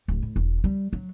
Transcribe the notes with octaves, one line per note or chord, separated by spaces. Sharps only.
D1
A2
E1
G3
F#3